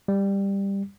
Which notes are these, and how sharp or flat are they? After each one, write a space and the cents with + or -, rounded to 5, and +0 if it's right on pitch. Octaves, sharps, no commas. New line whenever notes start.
G3 +10